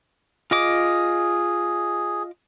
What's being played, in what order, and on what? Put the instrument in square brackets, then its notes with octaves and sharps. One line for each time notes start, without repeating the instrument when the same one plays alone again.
[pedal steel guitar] F4 D#5 D6 [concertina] G#4